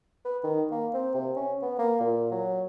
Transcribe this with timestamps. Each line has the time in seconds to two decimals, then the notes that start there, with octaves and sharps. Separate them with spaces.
0.25 B4
0.43 D#3
0.71 A#3
0.93 C4
1.14 C3
1.36 C#4
1.62 B3
1.78 A#3
2.00 A#2
2.31 F#3